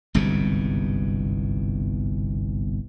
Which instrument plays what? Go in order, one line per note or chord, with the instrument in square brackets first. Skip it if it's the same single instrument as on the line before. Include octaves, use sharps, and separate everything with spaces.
[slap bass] G1 C2 G#2 B2